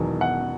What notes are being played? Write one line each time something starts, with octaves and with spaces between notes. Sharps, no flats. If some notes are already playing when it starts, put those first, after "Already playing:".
Already playing: E1 E2 D#3 F#3
F#5